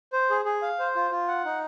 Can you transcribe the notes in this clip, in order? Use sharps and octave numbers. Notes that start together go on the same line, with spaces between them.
C5
G#4
G#4
F5
C5
F4
F4
F#5
D#4